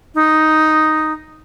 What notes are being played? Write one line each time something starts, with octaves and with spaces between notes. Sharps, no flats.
D#4